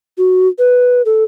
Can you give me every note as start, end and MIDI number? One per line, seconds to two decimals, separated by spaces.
0.18 0.48 66
0.58 1.02 71
1.05 1.24 69